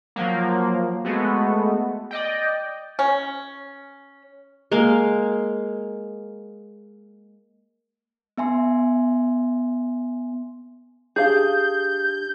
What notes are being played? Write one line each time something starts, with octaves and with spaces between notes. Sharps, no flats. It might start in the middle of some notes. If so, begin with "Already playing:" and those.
F3 F#3 A#3
G#3 A3 B3 F#4
D5 D#5 G5
C#4
G#3 A#3 A#4 F5
B3 E5 G#5 C6
D4 G4 G#4 F5 G6